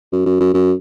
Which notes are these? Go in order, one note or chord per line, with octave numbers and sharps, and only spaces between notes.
F#2
F#2
F#2
F#2